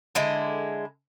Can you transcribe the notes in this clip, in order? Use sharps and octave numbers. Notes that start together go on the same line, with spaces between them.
D3 G#3 E4